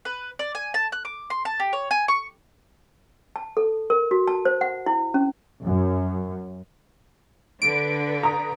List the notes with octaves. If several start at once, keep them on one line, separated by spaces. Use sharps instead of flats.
B4
D5
G#5
A5
F#6
D6
C6
A5
G4
C#5
G#5
C#6
A5
A4
A#4
F#4
A5
C5
F#5
E4
C#4
F#2
D3 B4 D7
A#5 D#6